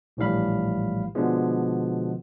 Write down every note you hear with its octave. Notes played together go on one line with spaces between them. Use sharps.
A#1 A2 E3 G3 F5 B5
B2 D3 F3 G#3 B3